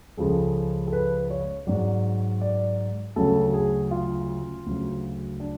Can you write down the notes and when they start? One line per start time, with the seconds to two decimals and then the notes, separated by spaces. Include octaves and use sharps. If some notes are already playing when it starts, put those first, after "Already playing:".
0.17 C#2 C#3 F3 G#3 A4
0.87 A4
0.93 B4
1.30 C#5
1.67 G#2 F#3 D5
2.41 D5
3.16 D2 C#3 F#3 A4
3.53 G#4
3.91 F4
4.66 D2 C#3 F#3
5.40 D4